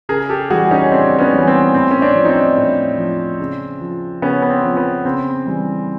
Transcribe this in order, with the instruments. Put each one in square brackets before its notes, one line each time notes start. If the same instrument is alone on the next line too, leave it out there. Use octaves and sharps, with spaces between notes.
[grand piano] C#3 G#4 A#4
G4 A4
E3 G3 F#4 G#4
C#4 D#4
C#3 C4 D4
B3 C#4
E3 G3
C4
A2 C4
C#4
C4 D4
F3
D#4
C4 D4
A2
F3
C#3
F3
C#3 B3 C#4
B3
C4
F3
B3
C#3 C4
E3 G3